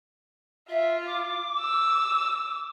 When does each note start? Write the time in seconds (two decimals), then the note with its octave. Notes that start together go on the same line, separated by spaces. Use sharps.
0.69 F4 E5
1.07 D6
1.59 E6